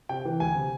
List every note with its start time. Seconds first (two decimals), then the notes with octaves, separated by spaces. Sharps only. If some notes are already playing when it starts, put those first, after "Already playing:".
0.09 C3 G5
0.25 E3
0.40 D2 G#5
0.55 C3